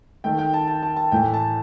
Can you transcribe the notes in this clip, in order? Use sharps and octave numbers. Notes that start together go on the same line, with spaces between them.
D#3 A3 G5
G5
A5
A5
A5
A5
A2 E3 A3 G5
A5